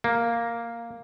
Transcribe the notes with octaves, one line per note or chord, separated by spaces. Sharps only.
A#3